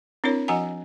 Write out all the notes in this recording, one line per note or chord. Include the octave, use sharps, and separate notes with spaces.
C4 D4 E4 A#4 C#5
F3 F#4 D#5 F#5 G#5 A#5